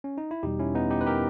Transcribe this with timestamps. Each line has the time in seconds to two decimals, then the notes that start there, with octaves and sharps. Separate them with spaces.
0.04 C#4
0.18 D#4
0.31 E4
0.43 E2 B2 G3 D#4 G4
0.59 C#4 E4
0.75 B3 D#4
0.91 D#4 G4
1.01 B4
1.06 G4 A#4